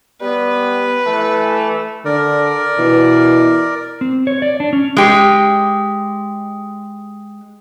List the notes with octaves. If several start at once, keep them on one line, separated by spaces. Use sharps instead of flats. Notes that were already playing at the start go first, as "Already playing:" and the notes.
G3 B3 B4
E3 A3
D3 A#4 D5
B2 E3
C4
C#5
D5
D4
C#4
G#3 G4